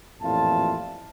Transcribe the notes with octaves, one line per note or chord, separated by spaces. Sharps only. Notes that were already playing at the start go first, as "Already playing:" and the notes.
A1 F2 A#2 E4 F4 A5